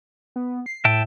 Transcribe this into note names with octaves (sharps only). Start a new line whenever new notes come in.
B3
C7
A2 E5 G5 A5